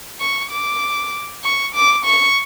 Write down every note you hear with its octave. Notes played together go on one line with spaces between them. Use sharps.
C#6
D6
C#6
D6
C#6